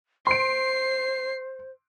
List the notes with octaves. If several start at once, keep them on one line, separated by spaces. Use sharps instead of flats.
C5 C6 C7 D7